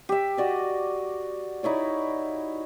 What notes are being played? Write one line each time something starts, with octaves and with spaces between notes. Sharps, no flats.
G4 E5
F#4 D5 D#5
D#4 E4 C#5 D5